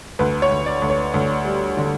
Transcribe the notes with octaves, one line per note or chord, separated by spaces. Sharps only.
D2 B4
C#5
D2
D5
D2
C#5
D2
G3
D3